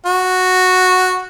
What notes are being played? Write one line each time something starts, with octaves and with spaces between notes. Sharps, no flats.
F#4